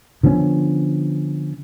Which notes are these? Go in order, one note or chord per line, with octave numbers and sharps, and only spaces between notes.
D3 F3 B3 C#4